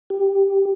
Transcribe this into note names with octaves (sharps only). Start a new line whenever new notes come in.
G4